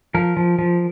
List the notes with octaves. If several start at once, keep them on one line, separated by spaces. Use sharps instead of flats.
F3 A#4
F3
F3